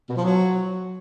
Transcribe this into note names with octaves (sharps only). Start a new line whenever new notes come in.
B2
F3
F#3